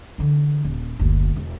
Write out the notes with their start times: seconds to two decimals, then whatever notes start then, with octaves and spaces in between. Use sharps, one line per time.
0.18 D3 E3
0.64 D#1
0.99 F#1 D2
1.36 E1